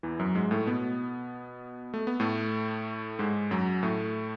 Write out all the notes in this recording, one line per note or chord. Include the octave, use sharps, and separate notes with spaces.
E2 E3
F#2 F#3
G#2 G#3
A2 A3
B2 B3
A3
B3
A2 A3
G#2 G#3
F#2 F#3
A2 A3